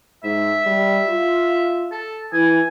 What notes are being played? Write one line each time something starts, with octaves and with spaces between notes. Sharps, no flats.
G#2 E5
G3
F4
A4
E3 G#5